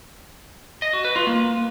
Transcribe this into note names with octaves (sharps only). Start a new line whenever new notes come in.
D#5
F#4
B4
F4
A#3